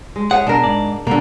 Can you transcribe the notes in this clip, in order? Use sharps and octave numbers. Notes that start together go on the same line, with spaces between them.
G#3
E4 G#4 C#5 F#5
B2 D4 A#4
G#2 D5
B2 D3 A#3